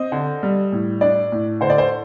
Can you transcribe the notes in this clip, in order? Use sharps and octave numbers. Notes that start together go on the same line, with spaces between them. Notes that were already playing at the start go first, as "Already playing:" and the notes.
Already playing: C4 D#5
D3
G3
A2
D4 D5
A2
D3 C5
D5
C5